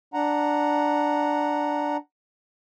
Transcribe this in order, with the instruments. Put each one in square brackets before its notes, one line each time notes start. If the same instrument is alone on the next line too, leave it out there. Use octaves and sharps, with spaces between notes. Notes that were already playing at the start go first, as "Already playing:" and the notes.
[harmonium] D4 F#5 A#5